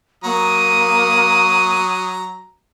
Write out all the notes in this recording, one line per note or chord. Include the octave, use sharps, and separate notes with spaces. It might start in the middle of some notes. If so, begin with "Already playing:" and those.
F#3 A#3 A#5 D#6